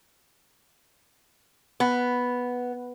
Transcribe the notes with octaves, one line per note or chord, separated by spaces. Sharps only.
B3